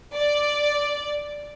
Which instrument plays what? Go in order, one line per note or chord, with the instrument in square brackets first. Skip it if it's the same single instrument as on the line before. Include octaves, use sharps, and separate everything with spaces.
[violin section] D5